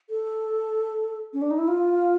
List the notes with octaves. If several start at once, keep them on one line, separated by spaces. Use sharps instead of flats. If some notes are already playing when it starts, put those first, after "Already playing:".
A4
C#4
D4
D#4
E4
F4